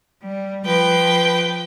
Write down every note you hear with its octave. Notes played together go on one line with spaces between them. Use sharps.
G3
F3 B4 G5